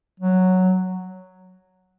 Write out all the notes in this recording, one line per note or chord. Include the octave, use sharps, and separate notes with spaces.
F#3